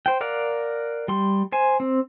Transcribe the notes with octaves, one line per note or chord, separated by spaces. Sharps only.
C5 G5
A#4 D5 F5 F#5
G3 C6
C5 G#5
C4